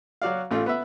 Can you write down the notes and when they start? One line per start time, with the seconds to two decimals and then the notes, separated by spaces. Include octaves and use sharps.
0.22 F#3 F#4 D5 F5
0.51 A1 A3 F4
0.66 B3 B4 E5